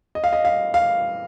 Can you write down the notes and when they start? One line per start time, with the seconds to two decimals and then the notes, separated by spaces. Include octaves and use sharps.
0.15 D#5
0.24 F5
0.33 D#5
0.45 F5
0.74 F5